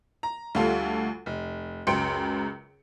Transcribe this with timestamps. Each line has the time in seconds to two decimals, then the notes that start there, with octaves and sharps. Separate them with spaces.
0.23 A#5
0.55 D2 G3 F4 A4
1.26 F1
1.87 C#2 F#2 G5 C6 C#7 D7